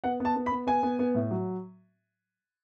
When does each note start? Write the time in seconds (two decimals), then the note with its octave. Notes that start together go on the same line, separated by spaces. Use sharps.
0.04 B3 F#5
0.20 B3 A5
0.36 B3
0.46 B5
0.51 B3
0.67 B3 G#5
0.83 B3
0.99 B3
1.15 A2
1.31 F#3